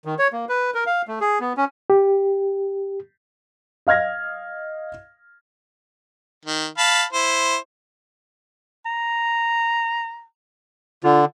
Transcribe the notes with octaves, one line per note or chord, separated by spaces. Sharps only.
D#3
C#5
A#3
B4
A#4
F5
A3
G#4
B3
C#4
G4
D#5 F5 F6 G#6 A#6
D#3
F5 A5 B5
E4 C5
A#5
D3 F4